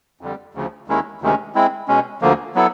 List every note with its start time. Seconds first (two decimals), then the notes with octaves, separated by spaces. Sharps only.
0.21 F2 D3 G3
0.55 D2 C#3 F3
0.88 D#2 D#3 G#3 C#4 E4
1.22 D2 C3 D#3 G#3 C#4
1.55 G#3 C4 E4
1.88 B2 G#3 C#4
2.21 D2 D3 F3 A#3
2.55 F#3 B3 E4 A4